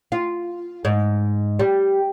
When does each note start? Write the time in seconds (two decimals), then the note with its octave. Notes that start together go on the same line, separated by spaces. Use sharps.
0.12 F4
0.85 G#2
1.59 G3